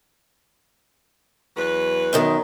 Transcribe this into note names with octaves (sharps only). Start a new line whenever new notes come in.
E2 F#3 B4
F#2 B2 D#3